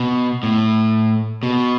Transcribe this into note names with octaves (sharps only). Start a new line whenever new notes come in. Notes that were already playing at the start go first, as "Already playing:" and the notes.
Already playing: B2
A2
B2